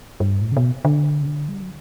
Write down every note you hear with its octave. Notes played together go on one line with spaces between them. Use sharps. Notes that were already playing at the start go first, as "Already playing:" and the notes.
G2
A2
C#3
B2
D3
C#3
D3
G3
F#3